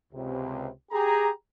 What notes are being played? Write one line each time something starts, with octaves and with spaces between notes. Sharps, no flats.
C#2 C3
G4 G#4 A#5